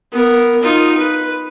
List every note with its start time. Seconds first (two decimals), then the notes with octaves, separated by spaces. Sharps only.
0.12 B3 A#4
0.63 D#4 F4
0.97 B4